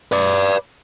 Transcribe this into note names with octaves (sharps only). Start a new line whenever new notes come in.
B4 D5